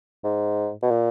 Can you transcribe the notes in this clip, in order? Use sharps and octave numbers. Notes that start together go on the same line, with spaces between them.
G#2
B2
A#2